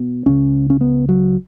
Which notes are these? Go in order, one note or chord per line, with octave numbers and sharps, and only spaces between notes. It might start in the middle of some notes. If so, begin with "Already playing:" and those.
Already playing: B2 B3
C#2 C#3 C#4
C#4
B3
F#3